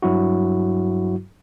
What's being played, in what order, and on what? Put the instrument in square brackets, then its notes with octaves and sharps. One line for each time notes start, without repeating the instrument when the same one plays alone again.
[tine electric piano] G2 F#3 E4 F#4